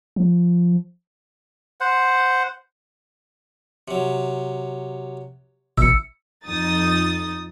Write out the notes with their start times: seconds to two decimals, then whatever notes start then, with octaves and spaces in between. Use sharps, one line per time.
0.16 F3
1.80 C5 F#5
3.88 C3 F#3
5.78 A1 B2 E4 E6 C#7
6.47 F2 D#4 D#6 A6